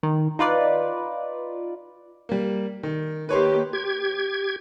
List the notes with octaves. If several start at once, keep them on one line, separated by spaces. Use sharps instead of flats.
D#3
D#4 F4 B4 D5
G3 A#3
D#3
D#3 A#3 G4 B4 C#5 C6
G4 G#6